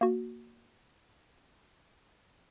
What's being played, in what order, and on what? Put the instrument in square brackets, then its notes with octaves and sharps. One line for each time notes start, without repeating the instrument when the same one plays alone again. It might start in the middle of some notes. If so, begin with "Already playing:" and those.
[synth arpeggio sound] A#3 F#4